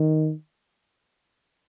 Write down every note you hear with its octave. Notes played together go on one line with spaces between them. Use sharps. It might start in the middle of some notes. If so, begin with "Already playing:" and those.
Already playing: D#3